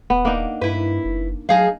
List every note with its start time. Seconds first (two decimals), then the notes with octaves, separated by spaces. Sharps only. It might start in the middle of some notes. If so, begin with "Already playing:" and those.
0.10 D#1 B3
0.25 A#3 D4 D#4
0.61 G2 E4 B4
1.05 F#1
1.49 F#3 D#4 G#4 F5